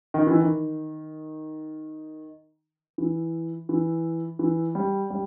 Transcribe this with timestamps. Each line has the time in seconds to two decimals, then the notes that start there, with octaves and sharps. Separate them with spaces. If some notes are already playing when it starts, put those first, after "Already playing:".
0.14 D#3
0.27 E3
0.40 D#3
2.98 E3
3.69 E3
4.39 E3
4.75 G3
5.10 G3